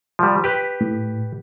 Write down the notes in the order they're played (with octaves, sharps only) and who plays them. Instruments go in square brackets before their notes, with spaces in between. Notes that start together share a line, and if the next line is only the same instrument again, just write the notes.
[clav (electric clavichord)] F3 G3
G4 B4
[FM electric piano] A2